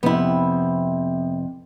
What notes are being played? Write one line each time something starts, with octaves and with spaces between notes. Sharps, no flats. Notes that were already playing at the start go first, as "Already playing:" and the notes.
F2 C3 B3 E4